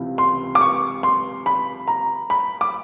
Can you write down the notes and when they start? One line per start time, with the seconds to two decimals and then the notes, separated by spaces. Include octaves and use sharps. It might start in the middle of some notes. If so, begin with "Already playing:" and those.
Already playing: C#2 C3 E3
0.18 C6
0.55 D6
0.61 C#6
1.03 C6
1.46 B5
1.88 A#5
2.30 B5
2.61 D6